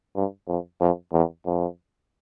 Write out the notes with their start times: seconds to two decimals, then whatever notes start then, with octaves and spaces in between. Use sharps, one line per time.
0.16 G2
0.48 F2
0.81 F2
1.13 E2
1.46 F2